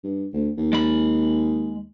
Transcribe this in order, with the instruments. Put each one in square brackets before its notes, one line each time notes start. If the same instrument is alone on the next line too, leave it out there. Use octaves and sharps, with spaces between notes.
[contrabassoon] G2
D2
D#2
[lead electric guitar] G#3 B5